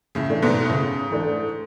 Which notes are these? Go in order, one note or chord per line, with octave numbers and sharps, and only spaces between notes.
A2 C#3
E3 A3 D4
G#2 B2
A2
G#2 C#3
E3 A3 D4